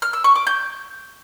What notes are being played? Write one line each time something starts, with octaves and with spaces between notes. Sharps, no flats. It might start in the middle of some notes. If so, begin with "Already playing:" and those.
F6
E6
C#6
D6
G6